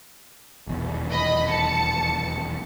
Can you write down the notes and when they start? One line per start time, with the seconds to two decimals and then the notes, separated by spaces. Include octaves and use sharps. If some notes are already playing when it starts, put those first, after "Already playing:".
0.67 D#1 B1 E2
1.11 D#5 B5
1.49 A5 C#7